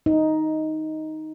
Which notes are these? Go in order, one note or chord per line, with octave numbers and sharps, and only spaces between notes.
D#4